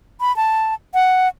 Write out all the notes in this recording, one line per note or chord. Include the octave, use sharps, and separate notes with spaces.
B5
A5
F#5